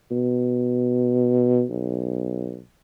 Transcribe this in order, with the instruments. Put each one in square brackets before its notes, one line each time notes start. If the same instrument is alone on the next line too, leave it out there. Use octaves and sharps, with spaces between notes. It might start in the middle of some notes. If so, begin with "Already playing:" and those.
[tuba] B2
B1